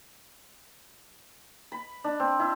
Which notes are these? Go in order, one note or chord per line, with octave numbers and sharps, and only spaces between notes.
B5
D4
C4
E4